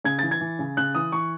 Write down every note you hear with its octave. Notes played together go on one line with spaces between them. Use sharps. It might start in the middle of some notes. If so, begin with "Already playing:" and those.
C#3 G#6
E3 A6
G#6
E3
C#3
C#3 F#6
E3 D#6
E3 C#6